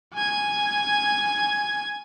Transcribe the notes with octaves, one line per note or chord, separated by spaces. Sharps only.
G#5 G#6